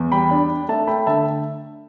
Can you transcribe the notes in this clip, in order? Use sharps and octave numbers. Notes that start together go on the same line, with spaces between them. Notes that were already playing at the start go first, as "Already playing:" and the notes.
Already playing: E2
G3 G5 B5
D4
D4
A3 E5 A5
A3 G5 B5
D3 E5 A5